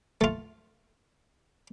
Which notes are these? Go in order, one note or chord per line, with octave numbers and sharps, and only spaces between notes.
A3 F4